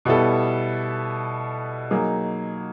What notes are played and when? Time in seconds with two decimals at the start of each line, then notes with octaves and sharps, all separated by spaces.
0.05 B2 G3 B3 E4 A4
1.91 F#3 A#3 D#4 G#4